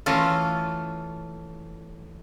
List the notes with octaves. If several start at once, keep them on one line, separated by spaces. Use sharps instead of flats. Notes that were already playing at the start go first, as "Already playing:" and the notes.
E3 A3 C#4 F4